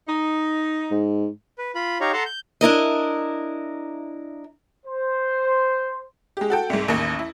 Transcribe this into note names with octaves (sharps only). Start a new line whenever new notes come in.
D#4
G#2
B4
F4 B5
D#4 G4 C#5 F5 A#5
A4 F#5 A5 A#5 C6
G6
D4 E4 A#4 D#5
C5
G#3 G4
F#4 A4 G5
C2 G#2
A1 D#2
E4